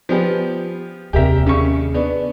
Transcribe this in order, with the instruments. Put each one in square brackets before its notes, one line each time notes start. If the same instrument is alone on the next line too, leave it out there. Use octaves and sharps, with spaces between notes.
[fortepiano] F3 B3 G4
[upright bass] D#2 C3 [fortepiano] G4 A#4 E5
[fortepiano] C#3 C#6
B3 D4